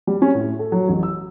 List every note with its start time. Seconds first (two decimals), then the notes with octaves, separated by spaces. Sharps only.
0.07 G3
0.22 C#4
0.35 A2
0.59 A4
0.72 F#3
0.89 A1
1.03 E6